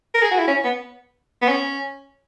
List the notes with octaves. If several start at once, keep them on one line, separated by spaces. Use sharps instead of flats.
A#4
G#4
F#4
E4
C#4
B3
B3
C#4